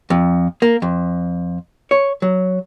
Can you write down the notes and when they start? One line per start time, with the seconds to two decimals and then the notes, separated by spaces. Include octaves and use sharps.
0.10 F2
0.62 A#3
0.82 F2
1.91 C#5
2.22 F#3